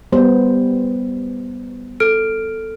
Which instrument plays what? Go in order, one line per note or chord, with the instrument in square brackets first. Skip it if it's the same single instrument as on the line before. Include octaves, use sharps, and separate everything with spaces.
[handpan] G3 B3 C5
[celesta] A4 F6 D7